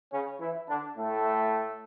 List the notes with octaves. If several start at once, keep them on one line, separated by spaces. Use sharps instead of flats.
C#3 C#4
E3 E4
D3 D4
A2 A3